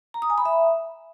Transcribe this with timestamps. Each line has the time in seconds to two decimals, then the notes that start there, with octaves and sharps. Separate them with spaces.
0.14 A#5
0.22 D#6
0.30 G#5
0.38 B5
0.45 E5